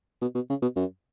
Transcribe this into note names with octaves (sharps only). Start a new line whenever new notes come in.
B2
B2
C#3
B2
F#2